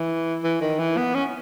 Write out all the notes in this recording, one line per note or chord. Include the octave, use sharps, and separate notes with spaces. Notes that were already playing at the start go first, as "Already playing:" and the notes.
Already playing: E3
E3
D#3
E3
B3
C#4